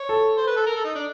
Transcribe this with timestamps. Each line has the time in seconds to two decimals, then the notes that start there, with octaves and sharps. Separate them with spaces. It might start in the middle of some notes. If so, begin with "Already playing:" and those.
Already playing: C#5
0.09 A4
0.37 C5
0.47 B4
0.56 A4
0.67 A#4
0.76 A4
0.85 D#4
0.95 D4